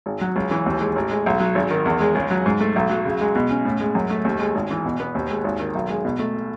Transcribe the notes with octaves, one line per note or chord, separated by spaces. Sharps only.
G#1
F#3
C#2
E3
D#2
G#3
A1
G#3
B1
F#3
G#1
D#3
E2
G#3
C#2
F#3
G#2
A3
B1
F#3
C#3
G#3
B2
C#4
A2
G#3
F#2
A3
D#2
G#3
G#1
E3
B2
B3
D#2
G#3
G#1
D#3
B1
G#3
B2
A3